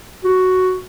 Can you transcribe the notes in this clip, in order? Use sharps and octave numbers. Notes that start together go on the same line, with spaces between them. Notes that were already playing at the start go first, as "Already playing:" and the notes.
F#4